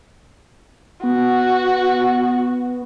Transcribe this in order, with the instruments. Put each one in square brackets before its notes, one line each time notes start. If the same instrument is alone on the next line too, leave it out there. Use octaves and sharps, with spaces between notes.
[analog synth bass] B3 [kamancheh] F#4